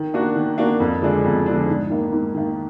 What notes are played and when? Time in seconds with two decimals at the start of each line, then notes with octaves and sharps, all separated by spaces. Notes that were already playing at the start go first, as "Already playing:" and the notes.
Already playing: D#3
0.14 A#3 D4 F#4
0.36 D#3
0.58 A#3 D4 F#4
0.80 F2
1.02 D3 F3 G#3 D4
1.24 F2
1.46 D3 F3 G#3 D4
1.68 G#2
1.90 D#3 A#3
2.12 G#2
2.35 D#3 A#3